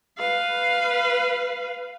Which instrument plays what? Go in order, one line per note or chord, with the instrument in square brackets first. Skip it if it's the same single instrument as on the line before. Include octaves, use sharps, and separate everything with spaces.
[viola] B4 F5